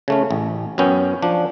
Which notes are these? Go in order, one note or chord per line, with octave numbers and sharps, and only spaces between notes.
C#3 A3 C#4
A1
F#2 B3 C#4 G5
F3 D4